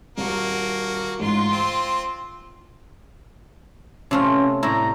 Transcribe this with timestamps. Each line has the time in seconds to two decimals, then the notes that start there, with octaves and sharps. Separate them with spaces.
0.17 D#1 A#3 F#4
1.20 A1 G#2 F4 C6
1.52 C4 D7
4.11 C3 A3 C#4 F4
4.63 A2 G3 E4 A#5